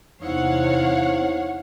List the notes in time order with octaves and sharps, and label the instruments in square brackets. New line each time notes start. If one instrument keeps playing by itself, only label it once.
[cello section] E2 C3 [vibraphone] D#4 E4 C5 [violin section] C#5 F5 F#5